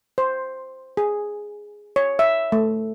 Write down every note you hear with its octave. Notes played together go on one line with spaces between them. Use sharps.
C5
G#4
C#5
E5
A3